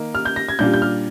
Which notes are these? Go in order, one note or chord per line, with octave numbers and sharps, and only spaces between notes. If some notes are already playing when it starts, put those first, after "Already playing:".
Already playing: D#3 A#3 D#4
F6
G6
A#6
G#6
A#2 G3 D4 F4 G6
G6
F6